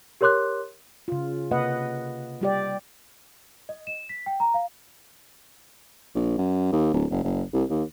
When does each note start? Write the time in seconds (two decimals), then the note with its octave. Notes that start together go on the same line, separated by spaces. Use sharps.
0.21 G4 A#4 C#5 C6 D6 F#6
1.08 C#3 F4
1.51 C3 A#3 B4 D#5 F#5
2.41 G3 G4 D5
3.69 D#5
3.87 E7
4.09 B6
4.26 G5
4.40 A#5
4.54 F5
6.15 A#1
6.38 F#2
6.72 D#2
6.93 D1
7.11 F#1
7.24 F#1
7.53 C2
7.70 D#2